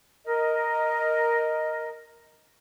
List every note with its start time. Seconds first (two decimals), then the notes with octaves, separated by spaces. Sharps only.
0.25 A#4 D#5